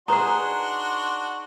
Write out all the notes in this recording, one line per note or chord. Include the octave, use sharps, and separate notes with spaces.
D4 D#4 F#4 G#4 B4 A#5 C6